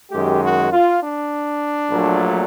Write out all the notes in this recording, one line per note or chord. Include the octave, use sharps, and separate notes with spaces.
F#2 D#3 G#3 G4
F#4
F4
D4
A#1 A#2 F#3 A3